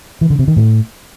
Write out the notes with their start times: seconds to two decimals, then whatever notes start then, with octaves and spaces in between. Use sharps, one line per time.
0.21 E3
0.30 D3
0.39 C3
0.48 D#3
0.56 A2